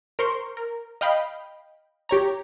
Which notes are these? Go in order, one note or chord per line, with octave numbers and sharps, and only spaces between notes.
A#4 C5 C6 C#6
A#4
D#5 F5 G5 B5
G4 C#5 A#5